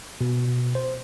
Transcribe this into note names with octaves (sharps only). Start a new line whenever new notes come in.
B2
C5